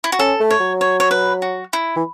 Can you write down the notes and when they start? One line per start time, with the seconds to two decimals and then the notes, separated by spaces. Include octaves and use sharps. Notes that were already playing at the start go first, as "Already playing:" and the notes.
0.04 E4
0.12 F#4
0.19 C#4 A4
0.40 A3
0.50 C#5
0.60 F#3
0.81 C#5
1.00 C#5
1.11 B4
1.42 F#4
1.73 E4
1.96 E3